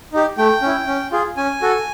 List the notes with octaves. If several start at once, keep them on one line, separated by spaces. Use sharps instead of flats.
D#4 G4
A3 G5
C#4 E4
C#4
F4 G#4
C#4 G#5
F#4 A4